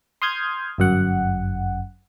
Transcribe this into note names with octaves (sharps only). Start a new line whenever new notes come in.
C6 D#6 F6 G6 G#6
G1 F#2 F#5